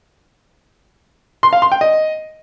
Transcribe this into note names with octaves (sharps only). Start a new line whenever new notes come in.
C6
F5
C6
G5
D#5